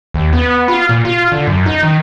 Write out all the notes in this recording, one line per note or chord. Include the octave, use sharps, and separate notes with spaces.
D#2
B3
F4
A#2
F4
D3
F#2
D#4
D#3